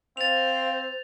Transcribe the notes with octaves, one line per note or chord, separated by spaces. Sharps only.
C4 C5 F5 A6 F7